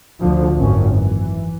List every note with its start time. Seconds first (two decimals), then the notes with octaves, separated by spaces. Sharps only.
0.20 D2 D3 F3
0.56 G#1 F#2 C#4
0.96 E3